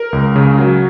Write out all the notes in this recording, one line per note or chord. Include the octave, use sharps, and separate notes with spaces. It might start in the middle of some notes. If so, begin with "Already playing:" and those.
Already playing: A#4
C#2
C#3
F#3